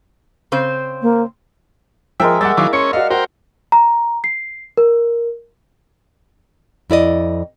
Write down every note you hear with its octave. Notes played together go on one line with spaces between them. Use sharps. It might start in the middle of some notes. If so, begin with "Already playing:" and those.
C#3 C4 C5
A#3
F3 G#3 A#4 E5 G5
G3 E5 F#5 D6 A6
D#3 F#3 E4 F5 D6
C#4 C#5 C6 C#7
F#4 D5 D#5 F5
F#4 A#4 C5 G5
A#5
C7
A#4
F2 E4 D5 D#5